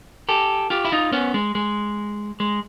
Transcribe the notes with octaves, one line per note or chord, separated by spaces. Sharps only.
G4 A4
F4 G4
E4
D#4 F4
B3 C#4
G#3
G#3
G#3